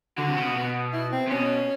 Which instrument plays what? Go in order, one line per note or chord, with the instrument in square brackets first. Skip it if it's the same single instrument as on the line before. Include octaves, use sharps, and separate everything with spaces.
[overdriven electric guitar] D3 [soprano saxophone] F#4
[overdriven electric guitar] C3
C#3
B2
B2
[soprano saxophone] E4
C4
[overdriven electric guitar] C3
[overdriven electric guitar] B2 [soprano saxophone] C#4